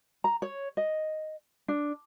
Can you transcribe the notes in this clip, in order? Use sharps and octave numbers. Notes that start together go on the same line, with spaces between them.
A#5
C#5
D#5
D4